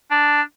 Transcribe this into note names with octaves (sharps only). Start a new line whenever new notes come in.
D4